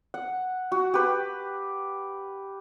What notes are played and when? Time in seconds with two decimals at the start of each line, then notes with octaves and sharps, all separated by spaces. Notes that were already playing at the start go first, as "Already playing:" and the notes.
0.14 F#5
0.72 F#4
0.94 G4 B4